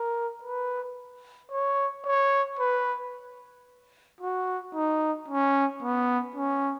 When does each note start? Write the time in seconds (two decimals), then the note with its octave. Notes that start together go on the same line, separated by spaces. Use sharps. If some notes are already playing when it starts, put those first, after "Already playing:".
Already playing: A#4
0.44 B4
1.52 C#5
2.05 C#5
2.59 B4
4.21 F#4
4.75 D#4
5.28 C#4
5.83 B3
6.36 C#4